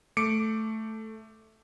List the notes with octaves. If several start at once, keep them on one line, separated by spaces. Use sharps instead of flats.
A3 D6 C#7 D7